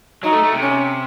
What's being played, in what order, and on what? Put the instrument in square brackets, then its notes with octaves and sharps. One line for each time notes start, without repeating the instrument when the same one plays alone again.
[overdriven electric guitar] F#3 [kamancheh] D#4
[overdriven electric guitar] A3
A3
C3
[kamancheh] C#4